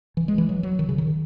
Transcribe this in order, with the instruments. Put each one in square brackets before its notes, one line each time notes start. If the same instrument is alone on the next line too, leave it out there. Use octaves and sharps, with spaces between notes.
[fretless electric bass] E3
G#3
E3
F#3
F#3
D#3
C#3
D#3